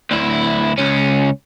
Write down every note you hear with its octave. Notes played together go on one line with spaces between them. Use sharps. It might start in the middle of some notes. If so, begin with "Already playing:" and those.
D2 E4
C#2 C#4